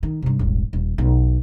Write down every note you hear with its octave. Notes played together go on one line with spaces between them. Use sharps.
D#3
G2 C3
D#1 G#1
D#1
B1